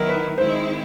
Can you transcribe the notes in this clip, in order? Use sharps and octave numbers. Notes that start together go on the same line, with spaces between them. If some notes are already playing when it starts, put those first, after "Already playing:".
Already playing: D#3 F#3 B3 E4 A#4
B4
D#3 G#3 C4 E4 C5